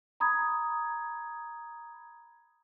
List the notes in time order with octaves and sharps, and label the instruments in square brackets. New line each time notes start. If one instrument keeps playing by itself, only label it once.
[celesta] A#5 B5 D#6 G#6